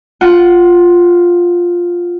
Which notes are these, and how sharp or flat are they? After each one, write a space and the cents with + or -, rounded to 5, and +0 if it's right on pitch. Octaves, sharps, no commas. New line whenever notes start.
F4 +5 F#5 +15